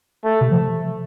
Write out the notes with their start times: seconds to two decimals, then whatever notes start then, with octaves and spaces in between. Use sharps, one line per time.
0.24 A3
0.41 C3
0.51 F3